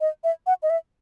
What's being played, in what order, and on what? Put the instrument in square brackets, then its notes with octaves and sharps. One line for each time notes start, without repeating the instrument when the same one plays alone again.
[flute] D#5
E5
F#5
D#5
E5